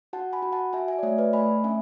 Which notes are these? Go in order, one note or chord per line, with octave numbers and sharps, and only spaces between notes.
F#4 F#5 A5
G#5 B5
F#4
F#5 A5
F#4 E5 G#5
E5 G#5
D5
A3 C#5 E5
B4 D5
A3 G#5 B5
C#4 E5 G#5